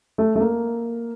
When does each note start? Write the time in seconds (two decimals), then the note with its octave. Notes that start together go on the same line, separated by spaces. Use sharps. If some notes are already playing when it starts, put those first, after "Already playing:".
0.18 A3
0.35 A3
0.40 A#3